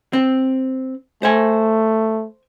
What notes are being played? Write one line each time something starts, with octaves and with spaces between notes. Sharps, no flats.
C4
A3 C5 G#5